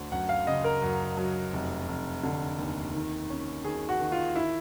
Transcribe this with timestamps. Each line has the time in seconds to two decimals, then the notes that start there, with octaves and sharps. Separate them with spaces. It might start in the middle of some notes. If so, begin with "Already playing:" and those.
Already playing: D2 D3
0.12 F#2 F#5
0.29 F5
0.47 C#3 D#5
0.64 A#4
0.82 F#2
1.17 F#3
1.53 F1
1.88 F1
2.23 D3
2.59 D#2
2.94 D#3
3.30 C#4
3.65 D#3 G#4
3.89 F#4
4.00 D#3
4.12 F4
4.36 E4